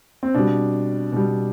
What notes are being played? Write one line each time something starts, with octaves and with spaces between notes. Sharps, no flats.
C4
B2 G3 D4
B2 G3